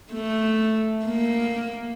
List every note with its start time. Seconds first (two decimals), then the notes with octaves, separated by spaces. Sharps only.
0.13 A3
1.05 A#3